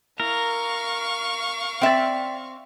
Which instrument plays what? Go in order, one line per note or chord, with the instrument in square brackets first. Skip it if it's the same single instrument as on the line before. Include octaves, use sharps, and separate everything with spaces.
[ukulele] E4 [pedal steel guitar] A#4 [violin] F5 C#6
[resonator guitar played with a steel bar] C4 E5 [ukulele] D5 G5